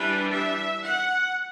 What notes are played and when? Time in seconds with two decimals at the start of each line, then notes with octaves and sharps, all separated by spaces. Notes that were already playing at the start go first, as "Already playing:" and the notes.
Already playing: E3 G3 D4 B4
0.32 E5
0.86 F#5